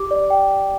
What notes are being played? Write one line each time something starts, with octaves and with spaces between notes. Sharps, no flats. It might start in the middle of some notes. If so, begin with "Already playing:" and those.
Already playing: G4 D6
D5
G5